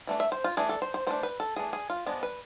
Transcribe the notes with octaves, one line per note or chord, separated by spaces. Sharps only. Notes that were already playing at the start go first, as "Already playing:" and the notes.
E3 A3 D4
E5
C5
F4
E3 A3 D4 G#4
A4
C5
C5
E3 A3 D4 C5
B4
A4
E3 A3 D4 G#4
G#4
F4
F3 G#3 B3 D4
B4